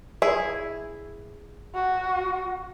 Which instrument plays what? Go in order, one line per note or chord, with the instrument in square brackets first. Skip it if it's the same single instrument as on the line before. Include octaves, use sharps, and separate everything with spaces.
[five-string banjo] E4 G#4
[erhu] F#4